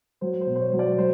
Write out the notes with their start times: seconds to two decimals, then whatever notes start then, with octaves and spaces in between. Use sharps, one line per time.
0.21 F#3 C5
0.41 C5
0.47 B2
0.56 C5
0.60 C#5
0.73 F#3
0.79 D5
0.98 F#3 C5